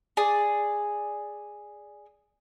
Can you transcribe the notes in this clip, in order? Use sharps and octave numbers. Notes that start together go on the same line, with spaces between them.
G#4 D5